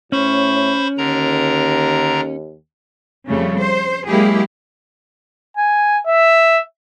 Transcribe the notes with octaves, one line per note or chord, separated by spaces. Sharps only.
A2 C#4 C5 B5 C#6
D#2 D3 A#4 A#5
F2 C#3 G3 A3
C5
F#3 G#3 A#3 E4 G4 G#4
G#5
E5